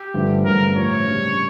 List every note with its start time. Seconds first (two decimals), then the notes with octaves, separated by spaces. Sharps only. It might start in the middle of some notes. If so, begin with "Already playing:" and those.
Already playing: G4
0.14 G2 D3 F3 A3
0.45 G2 D3 A3 C#4 A#4
0.76 A2 F3 C#4 C#5
1.07 C#3 G3 A#3 D4